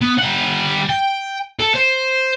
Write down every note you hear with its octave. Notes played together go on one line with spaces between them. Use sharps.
B3
G3 F#5
G5
A4
C5